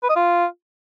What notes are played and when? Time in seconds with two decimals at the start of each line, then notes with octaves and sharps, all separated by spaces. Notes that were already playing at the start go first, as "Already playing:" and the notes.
0.03 B4
0.09 D#5
0.16 F4